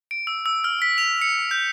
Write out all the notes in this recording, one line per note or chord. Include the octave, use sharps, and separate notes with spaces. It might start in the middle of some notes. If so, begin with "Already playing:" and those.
D7
E6
E6
F6
B6
F7
C#7
G6